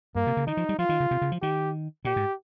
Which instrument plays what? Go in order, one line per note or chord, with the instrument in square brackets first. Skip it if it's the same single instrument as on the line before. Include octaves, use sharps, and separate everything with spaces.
[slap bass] G2 [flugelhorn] A#3
[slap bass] C3
C#3
[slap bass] D#3 [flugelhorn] D#4
[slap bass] F3
G3
[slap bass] F3 [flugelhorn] F4
[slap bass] D#3
C#3
C3
C#3
F3
[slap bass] D#3 [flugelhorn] G4
[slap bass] A#2 [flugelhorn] G4
[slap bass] G#2